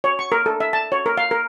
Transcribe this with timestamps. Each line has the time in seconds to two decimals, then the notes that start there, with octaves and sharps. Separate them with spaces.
0.04 C#5
0.19 C#6
0.32 A#4
0.46 A4
0.60 E5
0.73 A5
0.92 C#5
1.06 A#4
1.18 F5
1.31 A#4